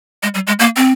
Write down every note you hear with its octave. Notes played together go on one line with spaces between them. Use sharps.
G#3
G3
G#3
A#3
C4